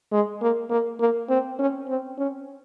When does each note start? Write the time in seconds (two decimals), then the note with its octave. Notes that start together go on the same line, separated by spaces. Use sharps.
0.12 G#3
0.42 A#3
0.70 A#3
1.00 A#3
1.29 C4
1.59 C#4
1.89 C4
2.18 C#4